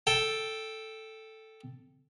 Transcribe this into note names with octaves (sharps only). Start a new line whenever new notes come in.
A4 G5